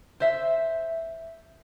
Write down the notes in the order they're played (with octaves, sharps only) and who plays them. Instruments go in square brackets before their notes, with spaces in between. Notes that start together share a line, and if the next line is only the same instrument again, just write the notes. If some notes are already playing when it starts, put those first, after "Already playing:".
[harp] C5 E5